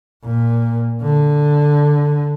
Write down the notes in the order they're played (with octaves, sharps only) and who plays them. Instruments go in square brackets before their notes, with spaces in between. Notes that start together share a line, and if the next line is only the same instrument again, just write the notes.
[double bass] A#2
D3